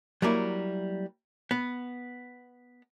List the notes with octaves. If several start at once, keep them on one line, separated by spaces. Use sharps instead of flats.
F#3 G3 A#3 E4
B3